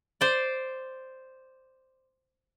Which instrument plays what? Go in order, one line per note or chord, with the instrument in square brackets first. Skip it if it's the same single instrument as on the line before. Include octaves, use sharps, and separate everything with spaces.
[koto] C5 D5